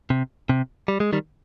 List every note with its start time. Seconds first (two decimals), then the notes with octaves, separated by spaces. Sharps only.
0.10 C3
0.49 C3
0.88 G3
1.00 G#3
1.13 D#3 G3